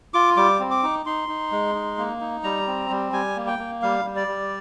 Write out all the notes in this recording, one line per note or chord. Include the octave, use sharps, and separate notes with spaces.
F4 D6
G3 D6
C4
D6
D#4
D#4 C6
D#4
G#3
D#4
A#3
D#4
G3 A#5
C4
G3
G3 G#5
A#3
G5
A#3
G3 F5
G3
D5
G3